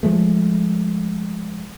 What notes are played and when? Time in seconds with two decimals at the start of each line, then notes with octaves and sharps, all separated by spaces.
0.03 F3 G#3 A3